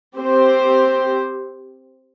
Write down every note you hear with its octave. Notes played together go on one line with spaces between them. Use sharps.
C4 G4 C5